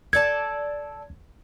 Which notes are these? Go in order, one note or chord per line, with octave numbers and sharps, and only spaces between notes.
A4 D5 A5 G#6